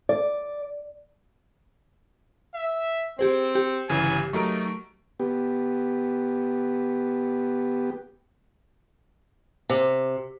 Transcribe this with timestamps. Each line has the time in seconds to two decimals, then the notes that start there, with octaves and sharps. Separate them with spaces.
0.09 D5
2.55 E5
3.19 C4 G4 G#4 C5
3.55 G4
3.89 G1 C#3 E3 G#5
4.33 F#3 A3 D#4 A#4 C#6 D7
5.20 B3 G4
9.70 C3